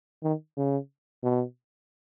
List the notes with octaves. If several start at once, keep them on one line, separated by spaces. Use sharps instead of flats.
D#3
C#3
B2